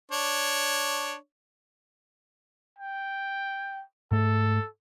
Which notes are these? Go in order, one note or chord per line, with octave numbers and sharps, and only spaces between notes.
D4 C#5
G5
G#2 A3 A4